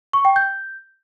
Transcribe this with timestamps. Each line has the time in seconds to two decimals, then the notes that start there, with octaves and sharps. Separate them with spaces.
0.13 C#6
0.25 G5
0.36 G6